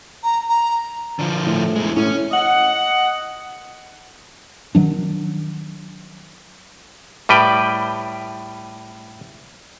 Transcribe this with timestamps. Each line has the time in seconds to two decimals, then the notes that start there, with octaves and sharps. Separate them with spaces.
0.23 A#5
0.48 A#5
1.19 D3 F3
1.46 A2
1.76 E2 G#3
1.96 A2 C#4
2.32 D#5 F#5
4.75 D#3 F#3 D4
7.29 A2 G3 B4 G5